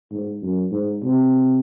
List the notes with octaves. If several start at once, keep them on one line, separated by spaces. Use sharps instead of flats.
G#2
F#2
G#2
C3